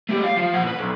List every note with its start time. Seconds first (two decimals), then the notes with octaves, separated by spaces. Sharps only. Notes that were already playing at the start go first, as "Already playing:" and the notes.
0.09 A3 G4
0.24 F5
0.37 F3
0.54 A#2 F#5
0.67 B4
0.79 B1